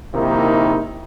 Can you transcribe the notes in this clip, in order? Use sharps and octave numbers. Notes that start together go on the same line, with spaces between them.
A#1 C3 D#3 A#3 D#4 E4